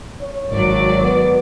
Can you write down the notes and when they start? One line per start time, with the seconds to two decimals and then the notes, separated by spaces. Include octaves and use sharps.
0.21 C#5
0.53 G#1 F#3 D5
1.01 B3